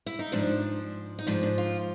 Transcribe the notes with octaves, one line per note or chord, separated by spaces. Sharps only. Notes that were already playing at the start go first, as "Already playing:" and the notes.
E4
D#4
G#2 F3 D4
D#4
G#2 F3 D4
D4
F4